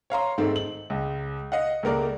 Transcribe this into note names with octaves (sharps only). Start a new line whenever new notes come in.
C#5 F5 A#5 C6
G#2 D#3 A3 C4
F#7
C#2
D#5 F5 F#5
C#2 A3 A#3 A#4 D5